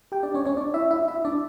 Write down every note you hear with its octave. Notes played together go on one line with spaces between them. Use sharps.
G4 G5
D4 D5
C#4 C#5
C#4 C#5
D4 D5
E4 E5
E4 E5
E4 E5
D4 D5